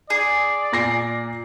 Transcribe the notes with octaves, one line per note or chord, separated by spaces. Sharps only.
G#4 D5
A#2 A#6 C7